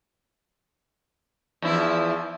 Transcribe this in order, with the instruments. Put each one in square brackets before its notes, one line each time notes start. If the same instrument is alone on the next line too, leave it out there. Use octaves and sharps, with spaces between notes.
[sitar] E2 F3 E4